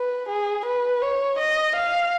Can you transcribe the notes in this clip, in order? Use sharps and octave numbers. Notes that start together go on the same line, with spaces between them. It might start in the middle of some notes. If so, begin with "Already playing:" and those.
Already playing: B4
G#4
B4
C#5
D#5
F5